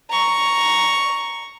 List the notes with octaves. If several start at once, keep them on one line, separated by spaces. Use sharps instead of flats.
A#5 C#6